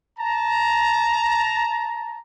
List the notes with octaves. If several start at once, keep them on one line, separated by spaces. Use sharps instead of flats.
A5 A#5